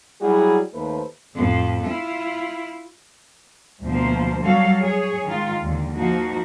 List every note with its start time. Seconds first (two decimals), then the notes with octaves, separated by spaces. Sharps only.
0.20 F#3 G3 E4 F#4 G#4
0.72 D#2 A3 B4 C5
1.35 F2 A2
1.84 E4 F4
3.83 D2 B2 F3 A#3 C5
4.42 F#3 G3 F#4 A4 C#5 F5
4.81 G#4 C#5
5.24 D#3 G#3 F4
5.62 D#2 D3
5.92 F3 A#3 D#4 F#4